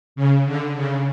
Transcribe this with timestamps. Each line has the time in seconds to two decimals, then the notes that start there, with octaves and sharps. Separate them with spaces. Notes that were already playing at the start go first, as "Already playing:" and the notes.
0.16 C#3
0.46 D3
0.76 C#3